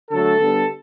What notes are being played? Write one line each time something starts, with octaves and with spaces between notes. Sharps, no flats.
D3 F#3 A3 A4
D3 G3 B3